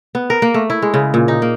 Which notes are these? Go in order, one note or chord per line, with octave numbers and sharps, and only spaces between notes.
B3
A#4
A#3
A3
E4
G#3
C#3
A#2
D#4
A#3